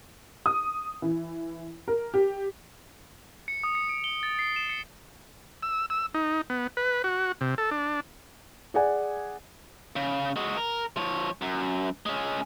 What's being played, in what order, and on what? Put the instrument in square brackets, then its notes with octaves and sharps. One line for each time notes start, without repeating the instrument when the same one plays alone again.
[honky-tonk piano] D#6
E3
A#4
G4
[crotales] C#7
D#6
C#7
D7
G7
A6
C7
E7
C#7
[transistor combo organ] E6
E6
D#4
B3
B4
F#4
C3
A4
D4
[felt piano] G#4 D5 F#5 G#5
[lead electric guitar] C#3
G#3 F#4
A#4
F3 C#5
F#2
G#3 C#4